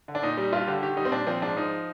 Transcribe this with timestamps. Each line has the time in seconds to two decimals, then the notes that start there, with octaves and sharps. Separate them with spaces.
0.08 D3
0.15 D4
0.23 A#2 D#4
0.37 G3 D#4
0.53 G2 F4
0.67 D3 G4
0.82 D#3 G4
0.97 G3 D#4
1.05 C4
1.12 A#2 D4
1.27 F3 C4
1.42 G#2 D4
1.57 F3 D#4